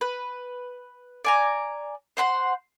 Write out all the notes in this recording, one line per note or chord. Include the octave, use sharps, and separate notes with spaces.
B4
D5 G#5 A#5
C5 F#5 B5 C6